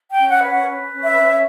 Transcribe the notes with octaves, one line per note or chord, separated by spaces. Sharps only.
G5
C#4
F#5
B4
F#5
B4
C#4
E5
C#4